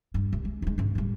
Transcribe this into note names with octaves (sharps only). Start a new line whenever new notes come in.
G2
C2
G#3
D#2 G#3
G#1 C#3
A2 G3